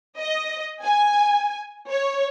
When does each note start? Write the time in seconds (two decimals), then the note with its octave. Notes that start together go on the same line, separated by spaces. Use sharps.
0.21 D#5
0.83 G#5
1.91 C#5